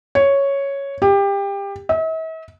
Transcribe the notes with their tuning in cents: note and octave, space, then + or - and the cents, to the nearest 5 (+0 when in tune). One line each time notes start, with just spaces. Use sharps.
C#5 +0
G4 +25
E5 -45